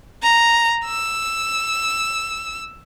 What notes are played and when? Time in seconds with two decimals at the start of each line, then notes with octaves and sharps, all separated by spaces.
0.23 A#5
0.86 E6